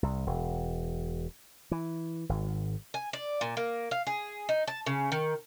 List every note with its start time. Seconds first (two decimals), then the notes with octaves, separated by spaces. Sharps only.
0.03 C2
0.27 E1
1.71 E3
2.29 G#1
2.94 G#5
3.13 D5
3.41 A#2
3.57 A#3
3.91 F5
4.07 G#4
4.49 D#4
4.67 A5
4.86 C#3
5.12 D#3